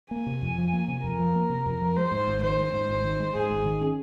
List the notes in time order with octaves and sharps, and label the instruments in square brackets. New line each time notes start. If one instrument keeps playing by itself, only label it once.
[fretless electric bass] A#3 [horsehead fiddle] G#5
[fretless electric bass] C3
F2
F3
A#3
C3
[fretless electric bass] F2 [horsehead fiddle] A#4
[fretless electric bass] F3
A#3
C3
F2
F3
[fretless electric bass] G#3 [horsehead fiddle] C5
[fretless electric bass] G#2
G#1
[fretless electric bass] D#3 [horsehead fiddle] C5
[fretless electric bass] G#3
G#2
G#1
D#3
G#3
[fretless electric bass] G#2 [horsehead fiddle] G#4
[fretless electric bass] G#1
D#3
C#4